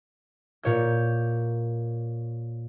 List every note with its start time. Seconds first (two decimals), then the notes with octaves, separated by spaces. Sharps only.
0.63 A#2 C#5 G6